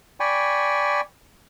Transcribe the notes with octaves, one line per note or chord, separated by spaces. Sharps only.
D5 G5 G#5 B5 C#6